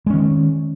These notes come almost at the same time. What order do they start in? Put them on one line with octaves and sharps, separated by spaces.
G#3 C#4 D#3